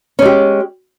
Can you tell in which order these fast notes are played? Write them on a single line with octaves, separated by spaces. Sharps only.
C#4 G#3 G4